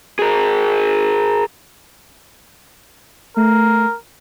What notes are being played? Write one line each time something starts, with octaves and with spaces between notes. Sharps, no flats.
G#4 A#4
A3 A#4